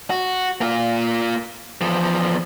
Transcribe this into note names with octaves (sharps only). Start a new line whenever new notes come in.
F#4
A#3 F4
E2 F3